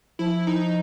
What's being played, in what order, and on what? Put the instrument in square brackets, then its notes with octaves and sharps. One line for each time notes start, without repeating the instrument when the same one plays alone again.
[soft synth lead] F3 [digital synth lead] E4
[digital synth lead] D#4